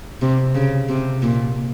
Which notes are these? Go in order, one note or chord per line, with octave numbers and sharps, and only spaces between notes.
C3
C#3
C3
A#2